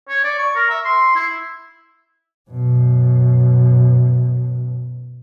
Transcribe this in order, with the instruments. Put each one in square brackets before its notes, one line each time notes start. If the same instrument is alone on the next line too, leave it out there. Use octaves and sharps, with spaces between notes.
[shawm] C#5
D5
C#6
A#4
E5
C6
E4
[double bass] F#2 B2